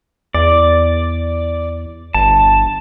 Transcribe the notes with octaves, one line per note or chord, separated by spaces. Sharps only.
E2 D5
G1 A5